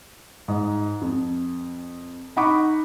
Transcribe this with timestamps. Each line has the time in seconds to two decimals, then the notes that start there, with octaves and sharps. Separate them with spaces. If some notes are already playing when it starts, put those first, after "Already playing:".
0.48 G#2
1.01 F2
2.36 D#4 F#5 B5 C#6 D6